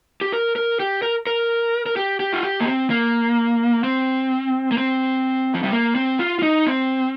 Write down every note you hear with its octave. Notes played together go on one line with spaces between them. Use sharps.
G4
A#4
A#4
G4
A#4
A#4
A#4
G4
G4
F4
G4
A#3
C4
A#3
C4
A#3
C4
F3
G3
A#3
C4
F4
F4
D#4
C4